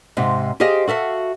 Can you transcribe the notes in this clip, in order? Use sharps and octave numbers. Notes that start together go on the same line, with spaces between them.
G#2 C3 D#4
G4 G#4 C5 D#5 F5
F#4 A4 E5 F5